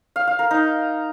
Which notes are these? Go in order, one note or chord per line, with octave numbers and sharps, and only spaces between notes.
F5
F5
A#4
D#4